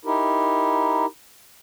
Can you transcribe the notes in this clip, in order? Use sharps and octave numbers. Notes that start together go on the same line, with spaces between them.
D#4 E4 G4 A#4